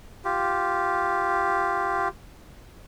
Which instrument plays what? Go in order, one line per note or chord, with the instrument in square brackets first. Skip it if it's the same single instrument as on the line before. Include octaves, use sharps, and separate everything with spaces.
[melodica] F4 G4